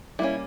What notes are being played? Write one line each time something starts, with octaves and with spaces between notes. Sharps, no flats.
G3 A#3 C#4 E4